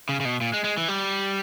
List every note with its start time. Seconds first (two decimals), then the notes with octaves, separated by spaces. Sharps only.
0.09 C#3
0.20 C#3
0.25 B2
0.41 A#2
0.53 G#3
0.64 G#3
0.77 E3
0.88 G3